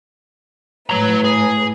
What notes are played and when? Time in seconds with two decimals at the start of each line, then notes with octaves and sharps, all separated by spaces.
0.90 A2 B4 C#5 A#5
1.25 G#4